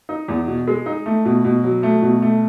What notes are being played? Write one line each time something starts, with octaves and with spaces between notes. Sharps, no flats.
D#4
E2
B2
G#3
D#4
A3
B2
B2
F#3
A3
B2
A3